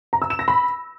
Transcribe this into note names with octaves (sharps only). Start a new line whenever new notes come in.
A#5
E6
E7
A#6
B5